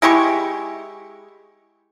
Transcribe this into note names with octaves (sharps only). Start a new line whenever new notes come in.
G#3 E4 G4 C#6